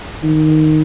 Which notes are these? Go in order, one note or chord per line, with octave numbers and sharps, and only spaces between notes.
D#3